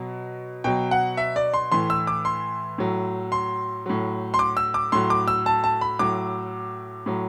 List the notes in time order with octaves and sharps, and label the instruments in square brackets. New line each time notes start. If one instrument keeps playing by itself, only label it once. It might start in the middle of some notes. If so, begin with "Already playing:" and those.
Already playing: [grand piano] B2 F#3
B2 F#3 G5
F#5
E5
D5
C6
A2 E3 C6
E6
D6
C6
A2 F#3
C6
A2 F#3
C6
D6
E6
D6
A2 F#3 C6
D6
E6
A5
A5
B5
A2 F#3 D6
A2 F#3